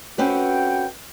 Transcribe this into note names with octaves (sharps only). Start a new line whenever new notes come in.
F2 C4 C#4 F#4 B4 F#5 G5